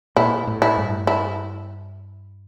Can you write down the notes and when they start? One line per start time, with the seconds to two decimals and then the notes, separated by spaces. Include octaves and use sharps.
0.16 A#2 E4
0.47 A2
0.62 E4
0.77 G2
1.07 E4